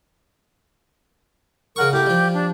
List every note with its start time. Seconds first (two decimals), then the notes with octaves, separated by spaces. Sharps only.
1.76 C#3 A#4 F#5 C#6
1.92 A2 A#3 G4
2.06 F3 G3
2.34 D4